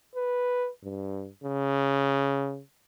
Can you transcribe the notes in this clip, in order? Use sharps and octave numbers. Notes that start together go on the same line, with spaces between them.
B4
G2
C#3